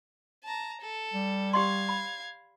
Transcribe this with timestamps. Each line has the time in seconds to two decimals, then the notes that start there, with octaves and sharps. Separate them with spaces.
0.44 A5 A#5
0.81 A4
1.13 G3
1.53 G4 D5 F5 C6 G#6
1.89 B5